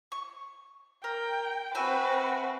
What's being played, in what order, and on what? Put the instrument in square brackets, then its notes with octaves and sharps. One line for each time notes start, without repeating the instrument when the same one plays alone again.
[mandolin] C#6
[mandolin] A#4 [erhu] G5
[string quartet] C4 F#4 [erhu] B4 [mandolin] E5 G5 G#5